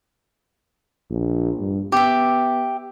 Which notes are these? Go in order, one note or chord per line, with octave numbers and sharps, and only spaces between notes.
A#1
G2
B3 G4 E5